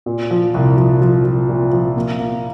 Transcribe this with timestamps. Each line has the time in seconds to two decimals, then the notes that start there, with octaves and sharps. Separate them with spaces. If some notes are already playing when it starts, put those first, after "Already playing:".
0.06 A#2
0.31 F3
0.54 C2
0.77 F3
1.02 F3
1.24 F3
1.49 A#2
1.73 F3
1.96 A#3
2.19 A#3